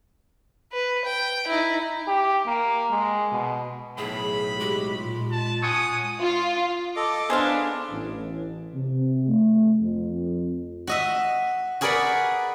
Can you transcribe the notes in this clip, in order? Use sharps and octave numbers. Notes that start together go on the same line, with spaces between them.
B4
G5
D#4 E4
G4
A#3
G#3
B2
B1 A2 G#4 B5
G#3 F#4 G4
A#2 F4
A5
C#5 F#5 G#5 D#6
F4
A4 D#5 D6
B3 D4 G#4 C5 F5
A1
C3
A3
F2
F#4 D#5 E5
F#4 G#4 A#4 B4 D5 F#5